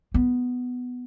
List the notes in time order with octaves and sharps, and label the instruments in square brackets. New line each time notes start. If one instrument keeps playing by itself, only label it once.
[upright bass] B3